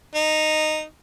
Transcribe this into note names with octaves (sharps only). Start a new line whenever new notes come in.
D#4